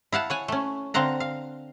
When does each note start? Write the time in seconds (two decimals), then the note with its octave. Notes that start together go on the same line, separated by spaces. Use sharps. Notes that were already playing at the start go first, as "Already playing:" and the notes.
0.12 E4 F5 F#5 A5
0.30 C#5 F#5 G#5
0.48 A3 C#4
0.94 D3 C4 F5 F#5 A#5
1.20 F5